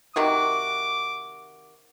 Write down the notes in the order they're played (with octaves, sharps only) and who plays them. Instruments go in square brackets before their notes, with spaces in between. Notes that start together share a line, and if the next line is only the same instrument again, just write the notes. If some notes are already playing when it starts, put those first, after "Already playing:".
[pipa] C3 D#3 F#4 [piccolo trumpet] D6